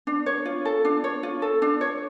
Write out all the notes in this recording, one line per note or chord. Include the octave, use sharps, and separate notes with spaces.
D4
C#5
F4
A4
D4
C#5
F4
A4
D4
C#5